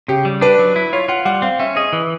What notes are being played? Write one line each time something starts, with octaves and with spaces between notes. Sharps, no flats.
C#3 G4
G3
D4 B4
F#3
E4
F4 C#5
F4 F#5
G3 F#5
C4 F5
C#4 E5
G#4 D#5
E3